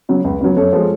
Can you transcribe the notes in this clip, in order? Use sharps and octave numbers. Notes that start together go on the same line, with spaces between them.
C#3 F#3
C#2
C#3 F#3
F#2 A4 C#5
F3 G#3